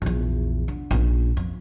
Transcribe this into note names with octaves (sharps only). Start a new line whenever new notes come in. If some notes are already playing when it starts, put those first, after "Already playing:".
A#1 E2
D3
A#1 C#4
F2